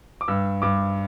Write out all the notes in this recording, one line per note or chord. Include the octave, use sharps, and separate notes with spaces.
D6
G2 E6
G2 D6